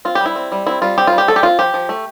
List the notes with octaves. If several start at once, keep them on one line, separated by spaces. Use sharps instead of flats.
C4 F4
G4
G3
E4
C4
G3
C4 E4
G3 F4
C4 G4
F4
G3
G4
A3 A4
G4
C4 F4
F3 G4
F3
A3